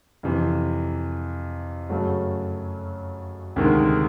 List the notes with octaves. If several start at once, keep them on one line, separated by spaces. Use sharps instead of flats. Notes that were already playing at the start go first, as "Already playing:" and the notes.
F2 C3 E3
F#2 C#3 F#3 A3
D2 C3 D#3 G#3